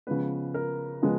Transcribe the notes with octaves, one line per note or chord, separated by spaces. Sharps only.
C#3 F3 G#3 B3 B4
A#4
C#3 F3 G#3 B3